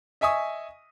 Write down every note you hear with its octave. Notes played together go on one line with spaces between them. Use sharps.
D#5 E5 G#5 C#6 D#6